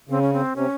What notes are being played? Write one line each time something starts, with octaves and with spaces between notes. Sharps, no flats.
C#3 C4
C#4
C4
C3 C#4